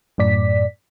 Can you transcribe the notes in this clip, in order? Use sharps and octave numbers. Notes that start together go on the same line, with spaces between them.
F#2 A2 D5 B6